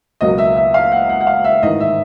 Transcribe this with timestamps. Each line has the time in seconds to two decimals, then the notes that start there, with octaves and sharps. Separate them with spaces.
0.21 C#2 B2 F#3 A#3 D#5
0.38 E5
0.57 E5
0.74 F5
0.92 F#5
1.09 F#5
1.21 F#5
1.27 F5
1.44 E5
1.63 A1 G#2 D#3 D#5
1.80 E5